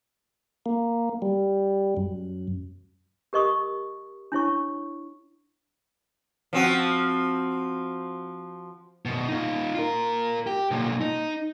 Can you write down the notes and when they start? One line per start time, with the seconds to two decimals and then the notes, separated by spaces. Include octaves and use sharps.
0.66 A#3
1.22 G3
1.97 F#2
3.33 G4 A#4 D#5 C#6 D#6
4.32 D4 E4 C#5 C#6
6.53 F3 C4 F#4
9.05 F#2 B2
9.28 D#4 F4
9.75 F4 A#4
10.47 G4
10.71 B1 A#2
11.01 D#4